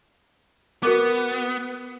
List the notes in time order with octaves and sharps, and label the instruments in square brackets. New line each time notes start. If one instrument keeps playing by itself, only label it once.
[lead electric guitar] B3 [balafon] F#4 A#4 D6